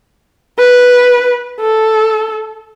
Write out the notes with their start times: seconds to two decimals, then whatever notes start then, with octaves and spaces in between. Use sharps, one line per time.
0.58 B4
1.60 A4